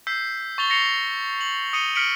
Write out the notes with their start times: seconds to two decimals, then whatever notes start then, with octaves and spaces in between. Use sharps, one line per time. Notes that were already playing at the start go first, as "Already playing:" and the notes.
0.07 E6 G6 B6 C7
0.58 C#6 A6 F7 G7
0.70 A#6 C7 C#7 F7 G7
1.41 F#7
1.73 D#6 C#7 D#7 F7 G7
1.95 F6 B6 C#7 D7 F#7